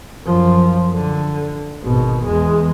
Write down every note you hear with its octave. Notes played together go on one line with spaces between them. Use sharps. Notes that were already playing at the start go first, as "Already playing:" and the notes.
F#2 F3
D3
G#1 B2
E2 G#3